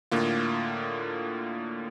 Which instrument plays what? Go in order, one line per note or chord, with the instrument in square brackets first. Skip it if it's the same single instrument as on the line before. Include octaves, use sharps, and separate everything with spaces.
[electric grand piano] A2 D3 A#3 F4